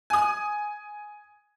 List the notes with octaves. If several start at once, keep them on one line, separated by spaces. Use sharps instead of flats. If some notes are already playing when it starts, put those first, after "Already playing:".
G#5 D#6